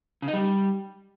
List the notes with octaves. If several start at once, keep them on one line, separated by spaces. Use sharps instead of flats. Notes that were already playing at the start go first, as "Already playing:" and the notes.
C#3
D#4
G3